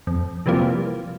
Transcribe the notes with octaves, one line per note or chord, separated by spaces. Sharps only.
F2
C3 E3 F3 G3 A#3